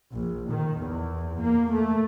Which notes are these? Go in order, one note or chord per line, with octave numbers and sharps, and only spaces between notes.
A#1
D#3
E2
A#3
A3